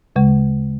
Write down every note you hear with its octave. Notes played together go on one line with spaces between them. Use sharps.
D2 C#3 G#3